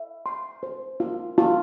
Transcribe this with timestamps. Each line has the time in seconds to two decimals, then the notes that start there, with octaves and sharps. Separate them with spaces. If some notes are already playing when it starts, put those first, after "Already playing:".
Already playing: E5
0.26 C6
0.63 C5
1.00 F4
1.38 F4